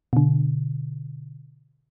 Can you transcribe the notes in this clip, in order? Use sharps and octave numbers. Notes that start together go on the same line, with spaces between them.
B2 D3